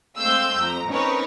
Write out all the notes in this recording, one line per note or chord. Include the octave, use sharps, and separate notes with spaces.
G#3 A3 C4 F5 E6 G6
F2 A#5
C4 C#4 D#4 A#4 B4 C#5